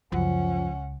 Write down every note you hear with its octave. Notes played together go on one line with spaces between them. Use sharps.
C#2 F#2 F3 C#4 F#5